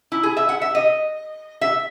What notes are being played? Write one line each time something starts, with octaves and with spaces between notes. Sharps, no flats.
E4
G#4
E5
F#5
E5
D#5
E5